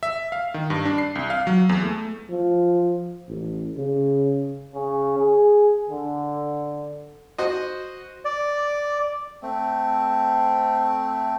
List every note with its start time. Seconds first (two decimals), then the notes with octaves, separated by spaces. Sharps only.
0.03 E5
0.32 F5
0.54 D#3
0.70 G2
0.85 D4
0.98 C7
1.15 C2
1.30 F5
1.47 F#3
1.69 E2
1.83 A3
2.30 F3
3.28 A1
3.78 C#3
4.75 C#3
5.18 G#4
5.89 D3
7.38 F#4 C5 D#5
8.25 D5
9.42 A3 C4